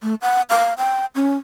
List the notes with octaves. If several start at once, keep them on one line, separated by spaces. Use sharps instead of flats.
A3
F#5
F5
G5
C#4